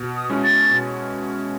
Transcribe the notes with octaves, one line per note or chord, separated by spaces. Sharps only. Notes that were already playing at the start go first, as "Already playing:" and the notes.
Already playing: B2
D#6
G#3 C#4 E4
A6
B2